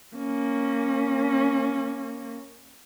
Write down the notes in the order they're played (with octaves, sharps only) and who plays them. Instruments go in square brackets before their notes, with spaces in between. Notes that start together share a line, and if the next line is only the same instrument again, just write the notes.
[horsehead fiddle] A#3 C#4